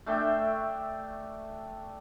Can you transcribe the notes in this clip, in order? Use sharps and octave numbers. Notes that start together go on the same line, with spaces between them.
A3 D4 E5 G5